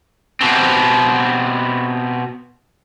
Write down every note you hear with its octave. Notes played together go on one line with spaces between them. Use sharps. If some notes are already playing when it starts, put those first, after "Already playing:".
B2 C4